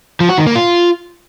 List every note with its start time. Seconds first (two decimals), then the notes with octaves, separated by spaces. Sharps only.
0.20 F3
0.29 F#4
0.38 D#3
0.47 A#3
0.56 F4